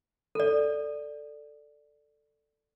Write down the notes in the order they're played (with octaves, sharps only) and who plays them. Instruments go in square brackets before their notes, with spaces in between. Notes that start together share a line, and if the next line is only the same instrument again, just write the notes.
[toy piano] A4 D5